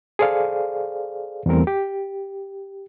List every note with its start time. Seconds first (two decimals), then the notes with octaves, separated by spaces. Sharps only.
0.19 G#4 A4 C5 D5 F5
1.46 E2 E3 G3 A3 C4 A#4
1.67 G4